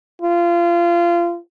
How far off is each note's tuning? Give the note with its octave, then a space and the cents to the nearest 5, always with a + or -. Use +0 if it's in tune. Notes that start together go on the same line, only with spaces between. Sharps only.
F4 -25